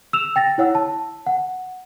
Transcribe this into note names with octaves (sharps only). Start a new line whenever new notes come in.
E6 E7 F7
G5 A6 A#6
E4 C#5 F#5 E6
A5
F#5